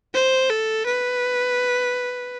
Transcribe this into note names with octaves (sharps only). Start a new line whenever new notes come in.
C5
A4
B4